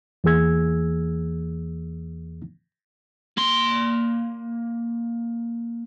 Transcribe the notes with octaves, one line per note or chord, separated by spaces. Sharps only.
E2 E3 A#3 G#4 E6 G#6
A#3 C6